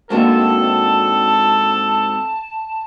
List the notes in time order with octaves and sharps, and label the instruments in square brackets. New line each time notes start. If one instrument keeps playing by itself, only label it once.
[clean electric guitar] G#2 C4 F#4 [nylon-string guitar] G#3 A#3 D4 [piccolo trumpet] A4 [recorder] A5